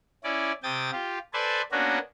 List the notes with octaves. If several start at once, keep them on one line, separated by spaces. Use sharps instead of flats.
C#4 E4 D5
C3 G5 D#6 A6
F4 G4
A4 B4 C5 D5 G#5 A5
A#3 B3 C#4 D4 F#4 A#4